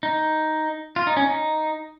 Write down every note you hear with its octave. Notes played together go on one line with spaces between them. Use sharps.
D#4
F4
D#4
C#4
D#4